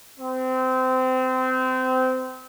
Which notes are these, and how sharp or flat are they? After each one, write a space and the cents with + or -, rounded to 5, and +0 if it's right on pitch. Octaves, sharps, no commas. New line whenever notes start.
C4 -25